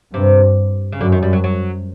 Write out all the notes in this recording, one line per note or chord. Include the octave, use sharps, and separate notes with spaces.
G2 C3
C#3
F#2 D3
D#3
G3
F#3
F#3